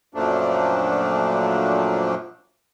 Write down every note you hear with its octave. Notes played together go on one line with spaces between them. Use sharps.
F#2 A#2 F3 A3 A#3 D4